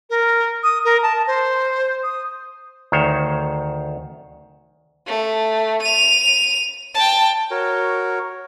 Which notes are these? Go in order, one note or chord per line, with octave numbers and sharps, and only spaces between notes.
A#4
D#6
A#4
A5
C5
D#6
D2 D#3 C5 C#5
A3
D#7 F7
G5 A5
F#4 A#4 C#5